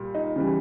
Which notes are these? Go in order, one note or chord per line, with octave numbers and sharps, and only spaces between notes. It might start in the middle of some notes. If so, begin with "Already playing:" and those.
Already playing: A#2 G3
D#4
C#3 E3 G3